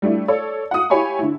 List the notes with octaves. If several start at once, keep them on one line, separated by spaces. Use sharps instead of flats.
G3 A3 D4 E4
A4 C#5 D5
F#5 D#6
E4 G4 C#5 G#5 B5 C#6
D3 E4